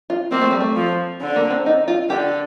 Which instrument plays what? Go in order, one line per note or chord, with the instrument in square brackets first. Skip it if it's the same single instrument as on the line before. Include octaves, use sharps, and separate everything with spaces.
[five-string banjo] F4
[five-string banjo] A#3 [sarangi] C4
[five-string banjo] A3
G3
A3
[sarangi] F3
D3
[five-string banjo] A#3
C4
D#4
F4
[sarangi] D3 [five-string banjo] G4